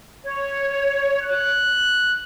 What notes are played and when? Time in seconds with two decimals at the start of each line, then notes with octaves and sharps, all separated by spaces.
0.24 C#5
1.23 F#6